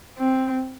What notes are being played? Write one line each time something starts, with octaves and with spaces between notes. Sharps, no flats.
C4